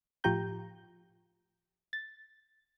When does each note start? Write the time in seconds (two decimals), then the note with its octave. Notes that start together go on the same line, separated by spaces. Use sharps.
0.24 A2 F3 F4 G4 A#5 G6
1.93 A6